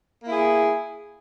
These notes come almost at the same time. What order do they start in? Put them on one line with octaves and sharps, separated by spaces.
A#3 E4 G#4